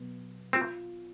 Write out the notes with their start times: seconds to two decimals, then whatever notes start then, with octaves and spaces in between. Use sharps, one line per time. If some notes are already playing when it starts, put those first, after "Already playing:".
Already playing: B2 F#3 B3
0.53 C4 F4